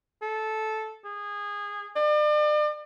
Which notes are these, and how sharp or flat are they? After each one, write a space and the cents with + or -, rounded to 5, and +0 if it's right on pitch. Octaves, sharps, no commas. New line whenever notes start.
A4 -10
G#4 -20
D5 +40